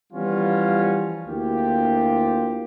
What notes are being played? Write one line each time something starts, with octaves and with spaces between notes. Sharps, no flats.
E3 F3 G3 B3 C#4 F4
D2 A#3 E4 F4 G4